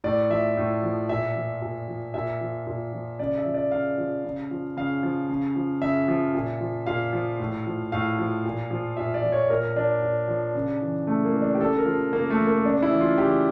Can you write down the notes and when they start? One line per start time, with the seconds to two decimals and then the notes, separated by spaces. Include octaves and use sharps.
0.04 A2 D5
0.30 F3 E5
0.57 A2
0.83 F3
1.09 A#2 E5
1.36 F3
1.62 A#2
1.88 F3
2.14 A#2 E5
2.41 F3
2.67 A#2
2.93 F3
3.19 C#3 D5
3.37 E5
3.46 F3
3.54 D5
3.71 C#3 F5
3.98 F3
4.25 C#3
4.51 F3
4.77 C#3 F5
5.03 F3
5.29 C#3
5.56 F3
5.81 C#3 E5
6.08 F3
6.34 A#2
6.61 F3
6.86 A#2 F5
7.13 F3
7.39 A2
7.66 F3
7.92 A2 F5
8.19 F3
8.45 A#2
8.71 F3
8.97 A#2 E5
9.14 D5
9.24 F3
9.32 C#5
9.50 A#2 A#4
9.76 F3 D4
10.02 A#2
10.28 F3
10.55 C#3
10.81 E3
11.07 C#3 A3
11.25 A#3
11.33 E3
11.42 D4
11.55 G4
11.60 C#3 A4
11.78 A#4
11.86 F3
12.13 C#3 A#3
12.30 A3
12.39 F3
12.47 A#3
12.64 C#3 D4
12.82 E4
12.91 E3
13.00 F4
13.17 C#3 G4